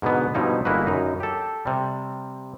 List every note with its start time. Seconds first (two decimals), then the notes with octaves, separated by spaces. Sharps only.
0.02 G#2 B2 D3 B3
0.34 G2 B2 F3 D#4 E4
0.65 G1 G#3 A#3 E4 F#4 B4
0.87 F#2 D#4
1.20 G4 A4
1.66 C3 G3